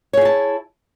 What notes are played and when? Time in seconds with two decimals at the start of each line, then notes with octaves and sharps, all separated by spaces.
0.13 C#5
0.17 G#4
0.21 E4
0.25 A5